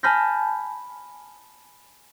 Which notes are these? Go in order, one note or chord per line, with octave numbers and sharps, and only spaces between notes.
G#5 A5 B5 F6 G6 A#6